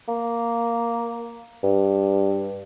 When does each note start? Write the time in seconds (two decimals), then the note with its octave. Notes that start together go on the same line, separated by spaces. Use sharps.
0.08 A#3
1.64 G2